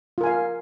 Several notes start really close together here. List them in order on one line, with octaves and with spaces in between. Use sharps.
F4 A#4 G#5 F5